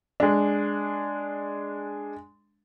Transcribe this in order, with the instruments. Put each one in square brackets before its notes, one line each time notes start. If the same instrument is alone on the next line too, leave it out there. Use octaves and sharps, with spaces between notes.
[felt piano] G#3 D4